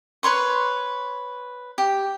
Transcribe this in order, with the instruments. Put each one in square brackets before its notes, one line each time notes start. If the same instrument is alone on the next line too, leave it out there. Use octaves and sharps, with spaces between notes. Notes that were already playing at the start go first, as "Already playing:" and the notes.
[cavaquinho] B4 C#5 C6 C#6
G4